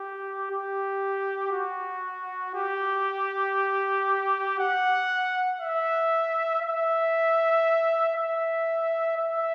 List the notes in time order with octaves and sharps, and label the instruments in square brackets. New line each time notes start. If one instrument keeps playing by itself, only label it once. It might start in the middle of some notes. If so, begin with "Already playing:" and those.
Already playing: [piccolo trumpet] G4
G4
F#4
G4
F#5
E5
E5
E5
E5